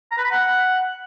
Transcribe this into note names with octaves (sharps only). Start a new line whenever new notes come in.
A#5
B4
B5
F#5